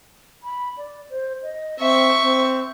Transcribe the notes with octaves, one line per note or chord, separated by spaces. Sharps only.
B5
D5
C5
D#5
C4 E5 C#6
C4